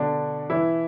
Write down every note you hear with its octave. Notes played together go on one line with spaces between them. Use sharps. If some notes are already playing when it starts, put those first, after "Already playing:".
Already playing: B2 D3 D4
E3 E4